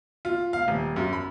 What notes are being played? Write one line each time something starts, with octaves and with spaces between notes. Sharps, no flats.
F4
F5
D#1
F#2
B5